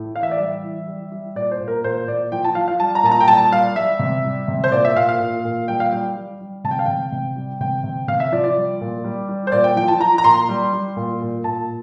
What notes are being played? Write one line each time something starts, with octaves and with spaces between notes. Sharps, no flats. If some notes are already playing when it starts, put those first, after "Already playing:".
Already playing: A2
E3 F5
E5
D5
G3 E5
E3
G3
G3
A#2 D5
C5
A#2
A#4
A#2 C5
A#2 D5
F3 G5
A5
F3 F5
F5
G3 A5
A#5
A#2 A5
A#5
G5
G3 A5
G3 F5
G3 E5
C3
G3
C3
C5
A#2 D5
E5
A#2 F5
F5
A#2
A#2
G3 G5
F5
G3 G5
G3
G3
C3 A5
G5
F5
C3 G5
C3
G3
C3 G5
C3
C3 F5
E5
F3 D5
D5
G3
A#2
G3
G3
C5
A#2 D5
G5
F3 G5
A5
F3 A#5
A#5
A#2 C6
G3
G3
A#2
A#2
A#2 A5